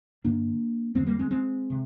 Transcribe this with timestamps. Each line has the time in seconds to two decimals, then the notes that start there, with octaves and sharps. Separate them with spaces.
0.24 G2 D3 A#3 D4
0.95 F2 D3 G#3 C4
1.06 G3 A#3
1.19 G#3 C4
1.31 G#3 C4
1.70 C3